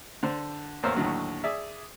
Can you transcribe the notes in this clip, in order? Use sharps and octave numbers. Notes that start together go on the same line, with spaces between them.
D3 D4 C5
A1 E2 A#3 C5 C#5 E6
D#2 A2 D3 F#3
G#4 D5 E5